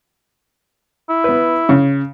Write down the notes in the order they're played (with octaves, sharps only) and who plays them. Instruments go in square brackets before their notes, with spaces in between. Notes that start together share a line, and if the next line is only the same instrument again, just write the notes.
[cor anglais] E4
[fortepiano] B3 B4
C#3